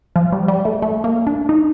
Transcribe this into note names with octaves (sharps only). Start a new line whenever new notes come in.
F3
G3
G3
A3
A3
A#3
D4
D#4